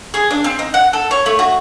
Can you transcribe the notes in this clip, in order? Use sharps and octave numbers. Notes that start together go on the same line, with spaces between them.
G#4
D4
C4
D#4
F#5
A4
C#5
A3
F#4